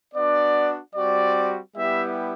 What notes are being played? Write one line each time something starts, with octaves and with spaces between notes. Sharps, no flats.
B3 D4 F#4 D5
G3 C4 F#4 D5
G3 B3 E4 G4 E5